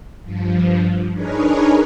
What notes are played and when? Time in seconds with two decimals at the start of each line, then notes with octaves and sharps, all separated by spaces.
0.23 G2 F3
1.13 D4 D#4 G#4 A#4 B4 C#5